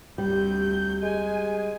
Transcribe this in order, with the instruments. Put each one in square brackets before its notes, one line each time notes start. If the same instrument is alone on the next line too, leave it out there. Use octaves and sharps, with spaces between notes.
[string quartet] D2 C3 G6 [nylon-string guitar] G3
[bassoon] G#3 [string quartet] G#5